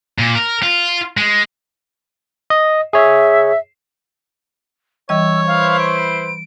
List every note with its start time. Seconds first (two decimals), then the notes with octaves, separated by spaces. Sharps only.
0.19 A#2
0.35 A#4
0.63 F4
1.17 G#3
2.50 D#5
2.93 G#4 C#5 E5
5.09 E3 G3 C#5 D#5 E6
5.47 E4 B4 C5 F5
5.79 D7